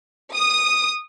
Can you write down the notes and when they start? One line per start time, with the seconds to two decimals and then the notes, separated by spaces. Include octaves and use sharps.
0.34 D#6